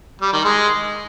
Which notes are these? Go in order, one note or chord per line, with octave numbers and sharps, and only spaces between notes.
G3
D#3
G#3